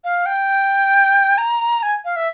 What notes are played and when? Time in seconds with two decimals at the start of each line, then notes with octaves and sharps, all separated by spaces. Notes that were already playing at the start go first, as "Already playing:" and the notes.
0.04 F5
0.26 G5
1.38 A#5
1.83 G#5
2.05 F5
2.16 E5